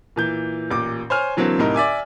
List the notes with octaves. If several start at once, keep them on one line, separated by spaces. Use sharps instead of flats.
A#2 E3 G6
A1 A#2 D6
C5 C#5 G#5 F6
D3 E3 F#3 A#3 C4
C2 A2 D#4 A#4
D5 E5 G#5 D6